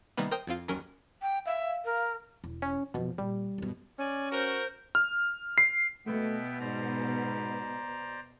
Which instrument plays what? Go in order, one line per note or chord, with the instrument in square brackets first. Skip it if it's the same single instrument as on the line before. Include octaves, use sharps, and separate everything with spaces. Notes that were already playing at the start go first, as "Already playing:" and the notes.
[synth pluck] C3 D#3 G3 A#3 B3
A#4 C5 G5 D#6
F2 C4 F4
G1 D#2 F#3 C#4 A#4
[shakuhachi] G5
[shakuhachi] E5 [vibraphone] F5
[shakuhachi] A#4
[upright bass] E1
[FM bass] C#4
[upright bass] F1 F3 [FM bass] B2
[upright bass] A#2 [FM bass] G3
[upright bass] F#2 B2
[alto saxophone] C#4 [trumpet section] D5 G#5
[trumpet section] F#4 A#4 [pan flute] C5
[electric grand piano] F6
C7
[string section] B2 [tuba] A3 [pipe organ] B3 E5 G5
[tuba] G#2 [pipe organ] C5 D5 A#5